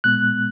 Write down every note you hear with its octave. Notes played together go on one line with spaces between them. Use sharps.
A#2 G#3 B3 F#6